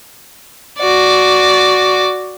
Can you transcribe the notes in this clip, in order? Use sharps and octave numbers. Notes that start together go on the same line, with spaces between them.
F#4 D5